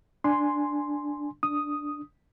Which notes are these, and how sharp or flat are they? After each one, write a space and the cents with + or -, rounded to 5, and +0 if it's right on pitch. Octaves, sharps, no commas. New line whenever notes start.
D4 +0 G#5 +0 C6 +0
D4 +0 D#6 +0